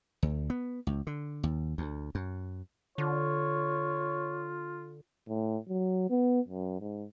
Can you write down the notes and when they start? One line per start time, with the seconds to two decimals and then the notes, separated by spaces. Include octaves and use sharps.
0.23 D2
0.50 B3
0.87 C#2
1.07 D3
1.43 D#2
1.78 D2
2.15 F#2
2.98 D3 F4 C#5
5.29 A2
5.68 F#3
6.10 B3
6.49 F#2
6.80 G#2